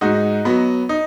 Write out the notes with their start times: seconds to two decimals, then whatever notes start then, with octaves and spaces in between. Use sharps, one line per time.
0.01 G#2 D#4 F#4
0.45 F#3 B3
0.89 D#4